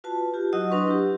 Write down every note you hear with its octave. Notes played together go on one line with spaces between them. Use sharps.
F4 F#4 B4 A5
F4 G4
F#3 E4 F#4 D#5 F#5 D#6
F#3 D4 B4 C6 C#6
E4 G4